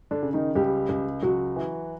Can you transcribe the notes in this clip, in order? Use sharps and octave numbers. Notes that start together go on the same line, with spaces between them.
D3 D4
C#3
D#3 D#4
C#2 G3 G4
C#2
C#2 F#3 F#4
E3